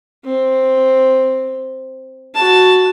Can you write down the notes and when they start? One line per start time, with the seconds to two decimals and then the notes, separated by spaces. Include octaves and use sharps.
0.25 C4
2.34 F#4 A5